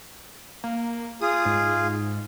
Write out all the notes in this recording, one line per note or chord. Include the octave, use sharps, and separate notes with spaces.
A#3
F4 G#4 D#6
G#2